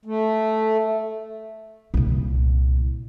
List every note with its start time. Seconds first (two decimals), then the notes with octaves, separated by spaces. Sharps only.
0.05 A3
1.94 C2 A#2